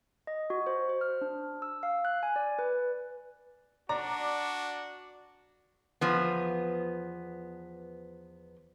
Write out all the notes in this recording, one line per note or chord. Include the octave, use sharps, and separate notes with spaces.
D#5
F#4
C5
C5
F6
D4
E6
F5
F#6
G#5
D5
B4
D4 F#4 D5 A#5
E2 F3 B3